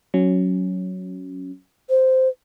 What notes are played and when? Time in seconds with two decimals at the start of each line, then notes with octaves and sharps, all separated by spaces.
0.14 F#3 C#4
1.89 C5